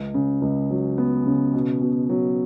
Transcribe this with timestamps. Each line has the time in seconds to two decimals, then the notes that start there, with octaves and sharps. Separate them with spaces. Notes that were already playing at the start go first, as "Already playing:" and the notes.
Already playing: C#2
0.14 C#3
0.42 C#2
0.71 F#3
0.98 B3
1.26 C#3
1.54 B2
1.82 B2
2.09 F#3